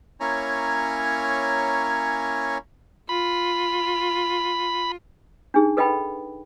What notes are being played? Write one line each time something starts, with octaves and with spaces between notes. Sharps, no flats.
A#3 C#4 E4 C#5 G#5 A#5
F4 B5
D4 D#4 G#4
A4 B4 D#5 F#5 G5 B5